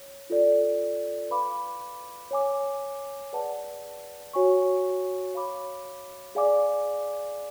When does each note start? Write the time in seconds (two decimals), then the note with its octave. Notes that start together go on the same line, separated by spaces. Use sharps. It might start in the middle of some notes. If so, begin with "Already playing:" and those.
Already playing: C#5
0.30 F4 A4 D5
1.30 B4 F5 B5 D6
2.31 C#5 G#5 D6
3.33 G#4 B4 D5 F#5 A5
4.34 F#4 C#5 G#5 C#6
5.34 C#5 F5 B5 D6
6.35 G#4 D5 F5 G#5 D6